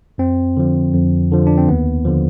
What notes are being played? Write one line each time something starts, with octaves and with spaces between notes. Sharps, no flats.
F2 C4
D3 F3
F2
D3 F3
D4
C4
D#2 B3
D3 F3